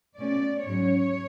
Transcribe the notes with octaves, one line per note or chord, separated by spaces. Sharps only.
B2 A3 C#4 D5
G#2 F#3 C#4 C#5